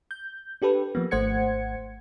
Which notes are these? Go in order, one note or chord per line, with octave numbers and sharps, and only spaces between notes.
G6
D4 G4 A4 B4
F3 A#3 B3
G#1 A3 C5 F#5 G#6 C#7